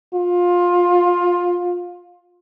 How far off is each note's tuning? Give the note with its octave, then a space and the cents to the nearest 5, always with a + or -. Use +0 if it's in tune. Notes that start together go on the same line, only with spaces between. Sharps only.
F4 +15